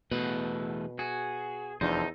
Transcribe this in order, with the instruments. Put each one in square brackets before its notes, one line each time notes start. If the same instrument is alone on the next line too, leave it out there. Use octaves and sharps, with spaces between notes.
[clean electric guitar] E2 A3 B4 [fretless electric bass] B2
[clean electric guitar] F#4 [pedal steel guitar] G#4
[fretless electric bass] F1 F3 D4 [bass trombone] E2 [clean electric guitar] D#4 [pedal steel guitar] A4 C5